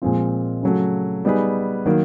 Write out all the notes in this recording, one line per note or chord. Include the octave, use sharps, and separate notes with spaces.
A#2 F3 G#3 C4 F4
C#3 F#3 A3
G3 B3 D#4 G#4 B4
D#3 F#3 A#3